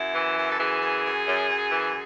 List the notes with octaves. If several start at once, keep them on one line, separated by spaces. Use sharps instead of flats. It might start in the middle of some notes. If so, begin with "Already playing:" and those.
Already playing: F#2 E4
E3
F#2
A4
E3 G#4
F#2
F#2
F#2
F#2
E3